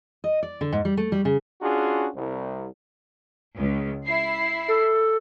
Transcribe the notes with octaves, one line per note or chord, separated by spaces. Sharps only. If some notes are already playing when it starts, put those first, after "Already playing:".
D#5
D5
D3
G#2
G3
A3
G3
C#3
C#4 D4 F4 F#4 G#4
C2
C#2
E4 C7
A4